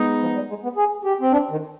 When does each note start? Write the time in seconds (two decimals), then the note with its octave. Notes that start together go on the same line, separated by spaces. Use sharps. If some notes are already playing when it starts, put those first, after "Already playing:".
Already playing: G#3 B3 D#4
0.21 F3
0.35 G3
0.49 G#3
0.63 B3
0.76 G#4
1.05 G4
1.21 C4
1.32 D4
1.51 D#3